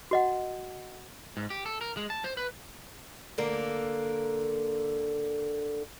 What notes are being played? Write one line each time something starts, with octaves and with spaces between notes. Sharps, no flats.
F#4 D#5 F#5
G#2
G4
A4
A#4
G#3
A5
C5
B4
D3 A#3